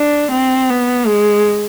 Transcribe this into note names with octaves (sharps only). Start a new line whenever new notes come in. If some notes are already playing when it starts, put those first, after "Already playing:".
Already playing: D4
C4
B3
G#3